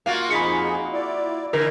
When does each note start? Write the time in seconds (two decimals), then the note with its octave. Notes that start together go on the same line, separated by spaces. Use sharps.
0.06 A#3 F4 F#4 F5
0.30 F2 D#4 G#4 B5 B6 C#7
0.93 E4 D5
1.53 D3 E4 A#4